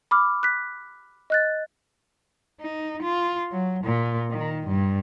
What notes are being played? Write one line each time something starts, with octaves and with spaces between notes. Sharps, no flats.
B5 D6 F6
F#6 B6
D#5 F#6 A6
D#4
F4
F#3
A#2
D#3
G2